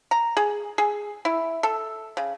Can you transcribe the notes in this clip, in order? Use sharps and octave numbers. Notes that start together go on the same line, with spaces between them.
A#5
G#4
G#4
E4
A4
C#3